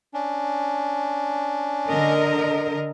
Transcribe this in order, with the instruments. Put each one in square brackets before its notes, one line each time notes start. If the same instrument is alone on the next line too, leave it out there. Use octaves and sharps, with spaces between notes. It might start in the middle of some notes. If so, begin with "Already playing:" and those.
[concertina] C#4 D4
[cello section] D3 A#4 D#5